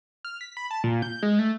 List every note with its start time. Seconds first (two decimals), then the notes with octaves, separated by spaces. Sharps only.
0.25 F6
0.41 B6
0.57 B5
0.71 A5
0.84 A#2
1.02 G6
1.23 G#3
1.39 A3